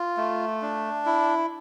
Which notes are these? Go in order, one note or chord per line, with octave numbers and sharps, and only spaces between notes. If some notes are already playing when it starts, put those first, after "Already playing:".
Already playing: F4
A3
D4
E4